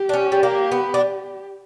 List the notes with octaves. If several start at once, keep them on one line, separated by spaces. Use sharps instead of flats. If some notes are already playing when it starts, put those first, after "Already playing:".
Already playing: G4
D4
C#4
G3
A#3
B3
D4